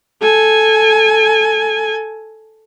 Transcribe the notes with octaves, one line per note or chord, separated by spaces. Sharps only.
A4 G#5